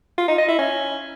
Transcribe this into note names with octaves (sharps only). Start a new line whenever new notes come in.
F4
D#4
D#5
E4
C#4